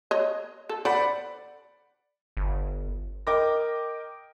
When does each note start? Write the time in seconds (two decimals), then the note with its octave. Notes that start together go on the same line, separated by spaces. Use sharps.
0.11 C#5 D#5
0.69 A4
0.85 A4 C5 D5 F#5 B5
2.37 G1
3.27 A#4 D#5 G5 D6 A#6